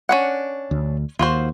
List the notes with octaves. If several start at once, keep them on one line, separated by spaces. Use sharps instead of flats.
C#4 D4 F#5
D2
D#2 F4 F#4 C5